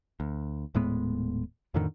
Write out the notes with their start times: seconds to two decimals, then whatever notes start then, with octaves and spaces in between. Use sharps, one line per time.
0.20 D2
0.75 D#1 A2 G#3 B3
1.74 F2 A2 D3 D#3